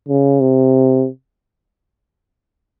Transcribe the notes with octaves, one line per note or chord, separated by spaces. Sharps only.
C#3
C3